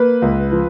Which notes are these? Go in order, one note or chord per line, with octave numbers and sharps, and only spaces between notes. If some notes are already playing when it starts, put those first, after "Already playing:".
Already playing: A#3 B4
C#2
F3